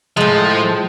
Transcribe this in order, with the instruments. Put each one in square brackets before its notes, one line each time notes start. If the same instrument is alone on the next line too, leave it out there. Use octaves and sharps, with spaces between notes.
[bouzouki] A2 G#3 [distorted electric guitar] F3